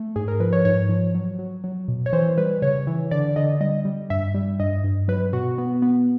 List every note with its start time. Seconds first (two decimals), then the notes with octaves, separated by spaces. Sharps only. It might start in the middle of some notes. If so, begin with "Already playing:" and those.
Already playing: A3
0.16 G#2 G#4
0.28 A#4
0.40 F3 B4
0.53 C#5
0.65 G#2 C#5
0.89 F3
1.15 F#3
1.39 F#3
1.64 F#3
1.88 B2
2.06 C#5
2.13 E3 C5
2.38 G3 B4
2.62 C#3 C#5
2.87 E3
3.11 D3 D5
3.36 D3 D#5
3.61 G3 D#5
3.85 G3
4.10 G2 E5
4.35 G3
4.60 G2 D#5
4.84 G2
5.08 F#3 B4
5.33 B2 F#4
5.58 B3
5.82 B3